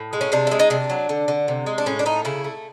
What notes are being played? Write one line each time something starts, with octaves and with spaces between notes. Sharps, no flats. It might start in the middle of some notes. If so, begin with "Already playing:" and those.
Already playing: A2
G#3
C#4
C3 D4
G#3 E4
D#4
C3 D4
F#3
D3
D3
C3
G#3
D4
A2 C#4
D4
A3 D#4
C#3 E4
A3